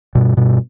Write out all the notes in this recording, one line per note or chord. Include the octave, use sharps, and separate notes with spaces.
G2 B2
G2 B2